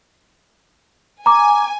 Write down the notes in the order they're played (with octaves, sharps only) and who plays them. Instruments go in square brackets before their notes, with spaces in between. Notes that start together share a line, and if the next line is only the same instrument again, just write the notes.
[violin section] G#5 [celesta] A#5 D6